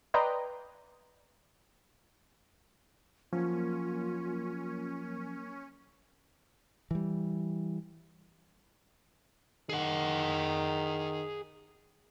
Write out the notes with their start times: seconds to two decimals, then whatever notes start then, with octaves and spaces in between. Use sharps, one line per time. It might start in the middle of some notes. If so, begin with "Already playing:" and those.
0.14 B4 D5 D#5 G5 A#5 C6
3.33 F3 F#3 A#3 C#4 F4 A#4
6.91 E3 G3
9.69 D#3 G#4 F#5